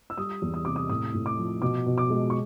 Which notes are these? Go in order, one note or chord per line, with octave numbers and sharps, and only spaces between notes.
E6
G3 D#6
E2
D#6
C3 D6
D#6
A2 D#6
A2
D6
F3
B2 D6
B2
D6
G#3
C#6